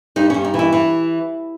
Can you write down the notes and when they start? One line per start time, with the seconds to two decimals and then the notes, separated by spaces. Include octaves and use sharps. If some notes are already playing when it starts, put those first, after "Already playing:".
0.16 G2 D#4
0.30 G2 C#4
0.44 D#4
0.54 E3
0.59 E4
0.73 E3